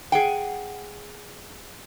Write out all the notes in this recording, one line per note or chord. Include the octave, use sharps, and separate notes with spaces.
G#4 F#5 G5